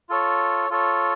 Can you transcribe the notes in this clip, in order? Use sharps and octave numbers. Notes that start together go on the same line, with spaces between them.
F4 A4 C#5
F4 A4 C#5